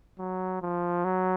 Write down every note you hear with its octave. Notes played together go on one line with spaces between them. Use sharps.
F#3
F3
F#3